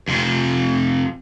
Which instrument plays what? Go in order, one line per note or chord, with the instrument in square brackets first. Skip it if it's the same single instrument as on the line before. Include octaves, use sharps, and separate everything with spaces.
[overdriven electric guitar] F2 C3